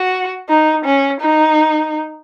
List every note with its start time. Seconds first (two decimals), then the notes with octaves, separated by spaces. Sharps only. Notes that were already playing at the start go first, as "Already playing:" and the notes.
Already playing: F#4
0.49 D#4
0.85 C#4
1.21 D#4